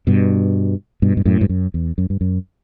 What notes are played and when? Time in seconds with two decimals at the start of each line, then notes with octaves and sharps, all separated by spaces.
0.07 G2 B2
1.02 G2 B2
1.17 G2
1.25 F#2 A2
1.41 G2
1.49 F#2
1.74 E2
1.98 F#2
2.10 G2
2.21 F#2